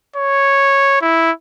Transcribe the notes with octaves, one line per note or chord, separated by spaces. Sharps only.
C#5
E4